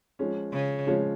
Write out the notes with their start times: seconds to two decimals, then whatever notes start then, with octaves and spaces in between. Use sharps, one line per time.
0.19 F3 G#3 C#4
0.53 C#3
0.87 F3 G#3 C#4